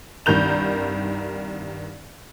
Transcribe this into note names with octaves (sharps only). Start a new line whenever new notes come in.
C2 G2 D#3 A#4 G6 F7